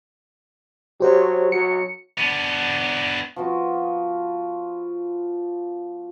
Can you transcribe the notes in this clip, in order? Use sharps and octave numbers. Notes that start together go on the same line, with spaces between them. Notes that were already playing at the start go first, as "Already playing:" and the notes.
F#3 G4 C5 C#5
F#3 C#7
B3 D4
F3 B3 F4 F#4